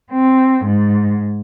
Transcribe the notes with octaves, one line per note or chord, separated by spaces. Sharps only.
C4
G#2